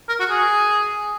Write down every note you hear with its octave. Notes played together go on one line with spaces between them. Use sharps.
A#4
F#4
G#4